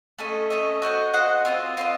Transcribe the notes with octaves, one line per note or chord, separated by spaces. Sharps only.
A3 C#4 A4 D#5
A3 C#4 A4 D#5
F#4 C5 D#5 F#5
F#4 C5 D#5 F#5
C4 F4 C5 D#5
C4 F4 C5 D#5